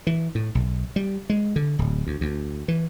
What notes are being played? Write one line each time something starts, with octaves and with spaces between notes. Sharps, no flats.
E3
A2
B1
G3
G#3
D3
D1
D2
D2
E3